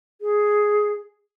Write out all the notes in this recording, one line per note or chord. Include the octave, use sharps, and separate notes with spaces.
G#4